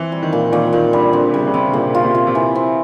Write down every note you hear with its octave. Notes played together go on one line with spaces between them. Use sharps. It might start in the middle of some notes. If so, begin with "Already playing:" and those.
Already playing: E3 C4
G3
D#3
A#2
A#2 D#3
A#2 D#3
D3 G3
D3 C4
C3
C#3 G3
C#3
C3 C4
D3
A#2 C#3
F4
C3
F4
C3
E3
C4